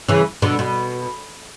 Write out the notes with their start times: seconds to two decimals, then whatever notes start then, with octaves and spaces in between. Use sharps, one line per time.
0.08 C#3 E3
0.42 B2 D3
0.59 B2